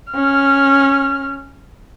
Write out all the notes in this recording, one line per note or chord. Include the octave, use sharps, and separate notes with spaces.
C#4 F6